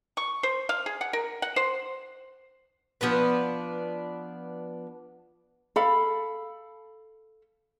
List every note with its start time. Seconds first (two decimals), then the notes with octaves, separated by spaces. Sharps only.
0.17 C#6
0.43 C5
0.69 F5
0.86 G#4
1.01 F#5
1.13 A#4
1.42 F#5
1.56 C5
3.01 F3 B3 D4 B4
5.76 A4 F5 B5